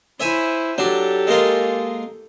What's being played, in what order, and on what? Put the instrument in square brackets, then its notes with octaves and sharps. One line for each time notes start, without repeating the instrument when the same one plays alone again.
[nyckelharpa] E4 C5 [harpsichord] C#5 E5 G#5
[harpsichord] F#3 D4 [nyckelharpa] G4 A4
[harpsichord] G#3 A#3 F4